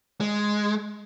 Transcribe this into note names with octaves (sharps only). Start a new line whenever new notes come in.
G#3